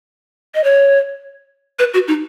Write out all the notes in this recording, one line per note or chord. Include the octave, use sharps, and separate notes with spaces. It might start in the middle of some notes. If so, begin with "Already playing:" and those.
D#5
C#5
B4
F#4
D#4